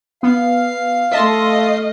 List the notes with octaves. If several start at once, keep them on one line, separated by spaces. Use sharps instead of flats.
B3 F5
A3 D#5 E5 A5 C6